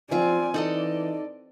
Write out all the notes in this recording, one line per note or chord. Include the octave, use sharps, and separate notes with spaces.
F3 C4 F4 D5 G#5
E3 D#4 A4 D5 D#5 F#5